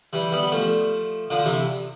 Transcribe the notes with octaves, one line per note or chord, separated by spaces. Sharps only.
E3 G3
G3 B3
F3 A3
D3 F3
C3 E3